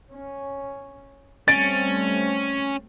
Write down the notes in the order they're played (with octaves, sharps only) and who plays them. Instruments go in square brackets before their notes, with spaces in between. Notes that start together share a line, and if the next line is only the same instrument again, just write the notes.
[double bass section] C#4
[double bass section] G3 A3 C4 [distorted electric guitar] C#4 [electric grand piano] A6 D7